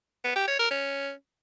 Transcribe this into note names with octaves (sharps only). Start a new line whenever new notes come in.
B3
G4
C#5
A#4
C#4